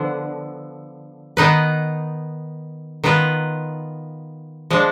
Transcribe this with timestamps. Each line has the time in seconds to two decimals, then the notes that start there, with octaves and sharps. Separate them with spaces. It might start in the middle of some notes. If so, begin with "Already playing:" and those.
Already playing: D3 F3 B3
1.37 D#3 B3 D#4 B4
3.04 D#3 B3 F4 B4
4.70 F3 G#3 D4